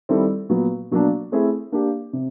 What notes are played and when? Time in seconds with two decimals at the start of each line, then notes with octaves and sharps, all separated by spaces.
0.09 D#3 G3 C4 E4 A4
0.49 A#2 F#3 B3
0.91 B2 F#3 A#3 D4
1.32 A3 C4 E4 G#4
1.72 A#3 D4 G4
2.13 C3